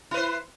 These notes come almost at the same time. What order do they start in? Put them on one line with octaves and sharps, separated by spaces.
E4 B4 C5